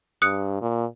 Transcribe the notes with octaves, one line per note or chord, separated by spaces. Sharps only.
G2 D#6 F#6 C#7
A#2